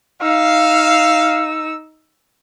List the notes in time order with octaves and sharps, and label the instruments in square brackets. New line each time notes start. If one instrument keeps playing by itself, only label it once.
[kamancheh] D#4 E6 [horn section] F5